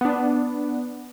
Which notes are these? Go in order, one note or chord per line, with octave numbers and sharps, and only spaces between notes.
B3 D4